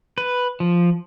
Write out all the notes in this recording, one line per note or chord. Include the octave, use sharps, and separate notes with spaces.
B4
F3